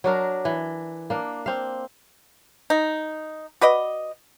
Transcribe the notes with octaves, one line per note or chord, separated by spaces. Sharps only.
F#3 D4 A#4
E3
A#3 D4
C4 F5
D#4
F#4 B4 D5 D#5